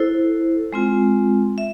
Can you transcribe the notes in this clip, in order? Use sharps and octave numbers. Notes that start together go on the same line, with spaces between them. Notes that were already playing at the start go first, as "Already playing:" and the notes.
Already playing: E4 A4 C5
G#3 C4 F4
E5